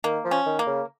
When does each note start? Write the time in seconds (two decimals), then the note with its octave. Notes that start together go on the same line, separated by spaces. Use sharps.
0.04 D#3 A#3
0.25 F3
0.31 C#4
0.46 D#3
0.59 A#3
0.67 C#3